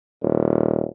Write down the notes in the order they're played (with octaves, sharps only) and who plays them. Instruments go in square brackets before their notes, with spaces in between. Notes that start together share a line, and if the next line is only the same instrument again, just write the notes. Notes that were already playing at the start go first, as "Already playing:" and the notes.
[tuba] D#1